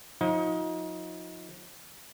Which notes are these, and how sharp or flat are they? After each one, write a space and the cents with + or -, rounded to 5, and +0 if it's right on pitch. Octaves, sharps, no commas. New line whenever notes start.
F3 +45 D#4 +30